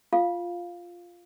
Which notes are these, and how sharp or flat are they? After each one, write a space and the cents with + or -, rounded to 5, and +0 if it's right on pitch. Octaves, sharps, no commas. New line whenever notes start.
F4 +0 F5 +0